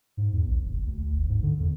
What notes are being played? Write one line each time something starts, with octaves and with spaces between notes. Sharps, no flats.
G#2
E2
A#1
F#1
D2
D2
G1
G#2
D3
E2